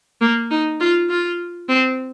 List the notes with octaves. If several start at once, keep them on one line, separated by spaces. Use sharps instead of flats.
A#3
D#4
F4
F4
C4